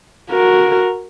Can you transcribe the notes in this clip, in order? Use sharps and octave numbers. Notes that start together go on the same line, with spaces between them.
F#4 A#4